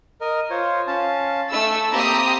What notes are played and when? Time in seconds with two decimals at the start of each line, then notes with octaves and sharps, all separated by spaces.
0.21 A#4 D#5
0.50 F4 C5 C#5
0.87 C#4 F5 A5
1.52 A3 A4 B5 E6
1.92 A#3 C4 G4 A#5 B5 D#6